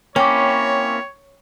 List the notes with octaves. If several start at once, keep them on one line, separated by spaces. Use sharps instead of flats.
A#3 C4 C#4 E4 C#5 G5 D6